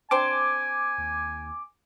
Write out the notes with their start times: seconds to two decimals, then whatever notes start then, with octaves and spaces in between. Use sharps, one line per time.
0.11 C4 D4 C5 G#5 D6
0.98 D#2